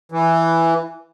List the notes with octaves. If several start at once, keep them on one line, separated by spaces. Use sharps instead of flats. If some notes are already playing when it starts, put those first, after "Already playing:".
E3